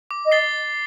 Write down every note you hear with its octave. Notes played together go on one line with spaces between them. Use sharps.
D6
D#5
A6 C7 G7